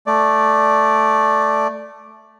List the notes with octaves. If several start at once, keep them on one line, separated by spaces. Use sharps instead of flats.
A3 D5